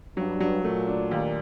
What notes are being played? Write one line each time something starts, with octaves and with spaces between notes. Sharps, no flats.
G2 F#3
F#3
A#2 A3
D4
D#2